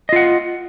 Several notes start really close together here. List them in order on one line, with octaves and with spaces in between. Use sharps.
D#5 F4 F#5